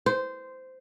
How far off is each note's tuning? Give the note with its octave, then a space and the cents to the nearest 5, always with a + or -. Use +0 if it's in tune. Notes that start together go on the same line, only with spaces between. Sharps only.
C5 -15